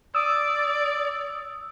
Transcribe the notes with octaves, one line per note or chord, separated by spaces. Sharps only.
D5 D#6 E6